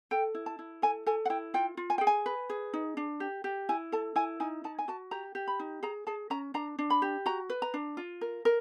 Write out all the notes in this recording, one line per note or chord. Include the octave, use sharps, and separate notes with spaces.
A4 G5
E4
A5
E4
A4 G#5
A4 G#5
F#5
E4 G5
F4 G5
F4
G#5
G#4 G5
G#5
B4
G#4
D#4
D4
G4
G4
E4 G#5
A4 A5
E4 G#5
D#4 G#5
D#4 A5
G#5
F#4 A5
G4 A#5
G4
B5
D#4
G#4 A#5
G#4 A5
C#4 A#5
D4 A#5
D4
B5
G4
F#4 A#5
B4
A#5
D4
F4
A#4
A#4